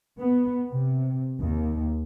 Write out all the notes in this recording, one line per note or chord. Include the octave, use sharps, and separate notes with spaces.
B3
C3
D#2